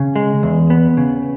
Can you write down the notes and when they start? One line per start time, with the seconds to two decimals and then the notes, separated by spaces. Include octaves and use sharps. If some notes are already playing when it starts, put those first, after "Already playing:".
Already playing: C#3
0.16 G#3
0.43 E2
0.70 B3
0.97 C#3